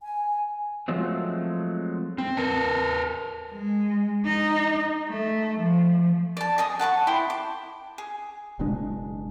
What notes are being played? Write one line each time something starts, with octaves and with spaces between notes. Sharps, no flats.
G#5
F3 F#3 G#3 A3 C4
C4
A#4 B4 A5
G#3
D#4
A3
F3
D5 A5
G#4 D#5 D#6
F#5 A5 B5 C#6
E4 G5 C6
D6
G#4
F#1 B2 G#3 D4